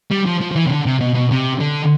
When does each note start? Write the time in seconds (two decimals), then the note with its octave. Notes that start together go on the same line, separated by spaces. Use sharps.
0.11 G3
0.26 F3
0.41 F3
0.51 F3
0.56 E3
0.66 C3
0.70 D3
0.86 C3
1.00 B2
1.15 B2
1.31 C3
1.60 D3